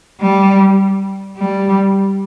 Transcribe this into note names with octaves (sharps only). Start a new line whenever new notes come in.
G3
G3